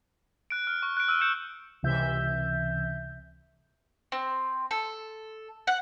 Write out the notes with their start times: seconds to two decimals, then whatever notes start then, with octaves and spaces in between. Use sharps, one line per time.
0.50 F#6 D7
0.67 F6
0.83 C#6
0.97 F#6 D7
1.08 E6 F6 D#7
1.21 G6 C#7 E7
1.83 C#2 C3 E3 E5 G6
4.12 C4
4.71 A4
5.67 F#5